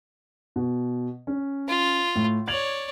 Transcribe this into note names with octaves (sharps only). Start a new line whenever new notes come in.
B2
C#4
F4
A2
C#5 D5 G#6 F7 F#7